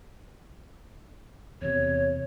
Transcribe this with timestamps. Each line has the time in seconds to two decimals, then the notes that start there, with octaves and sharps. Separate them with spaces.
1.62 E2 C3 C#5